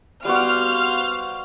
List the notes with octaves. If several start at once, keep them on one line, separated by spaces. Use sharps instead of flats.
G3 B3 F#4 C5 F5 F6